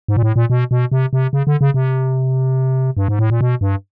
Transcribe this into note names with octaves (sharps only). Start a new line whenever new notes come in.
G#2
A#2
A2
A#2
B2
B2
C3
C3
C#3
D3
C#3
C3
G2
G#2
A2
A#2
B2
G2